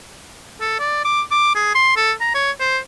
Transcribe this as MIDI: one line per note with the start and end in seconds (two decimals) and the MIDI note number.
0.61 0.76 69
0.80 1.03 74
1.05 1.22 86
1.31 1.53 86
1.55 1.70 68
1.75 1.94 84
1.97 2.12 69
2.21 2.32 82
2.34 2.51 73
2.60 2.79 72